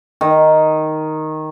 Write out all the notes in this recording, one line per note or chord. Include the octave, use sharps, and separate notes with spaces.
D#3